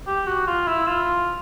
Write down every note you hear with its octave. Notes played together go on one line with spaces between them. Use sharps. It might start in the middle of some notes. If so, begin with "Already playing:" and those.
G4
F#4
F4
E4
F4